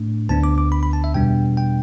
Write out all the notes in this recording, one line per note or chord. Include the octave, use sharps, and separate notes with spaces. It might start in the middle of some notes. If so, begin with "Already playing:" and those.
Already playing: A2 A3 D4
D2 D3 B3 D4 A5
D6
D6
B5
B5
A5
E5
E2 B2 G3 B3 D4 G5
G5